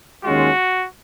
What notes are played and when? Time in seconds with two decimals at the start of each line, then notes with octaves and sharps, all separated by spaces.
0.23 D#2 D#3 G#3 C#4 F4 F#4